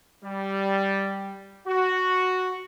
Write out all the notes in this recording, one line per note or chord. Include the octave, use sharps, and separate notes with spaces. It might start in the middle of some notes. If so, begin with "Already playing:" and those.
G3
F#4